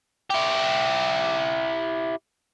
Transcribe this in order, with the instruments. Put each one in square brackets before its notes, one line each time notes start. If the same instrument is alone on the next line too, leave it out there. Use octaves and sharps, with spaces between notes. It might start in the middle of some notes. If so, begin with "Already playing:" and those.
[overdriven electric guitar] E4 G4